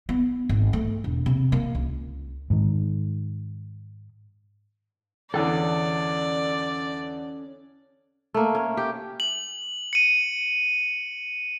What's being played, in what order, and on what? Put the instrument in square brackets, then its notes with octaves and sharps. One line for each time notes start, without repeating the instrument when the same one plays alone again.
[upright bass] B3
G#1
A3
E1
C3
A#3
C#2
[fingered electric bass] G#2 D#3
[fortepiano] E2 D3 E3 [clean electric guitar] C#4 A4 [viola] D5
[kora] A3 A#3
C#4
G4
[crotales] F#7
C#7 D#7